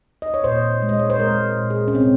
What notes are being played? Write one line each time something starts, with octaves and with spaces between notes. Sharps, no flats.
D#5
C#5
A#2 C5
G#3
D#5
C#5
C5
G#3 A#4
A#2
G#4
C#4
C3 C4